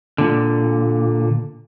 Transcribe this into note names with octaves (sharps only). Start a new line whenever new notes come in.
A#2 D3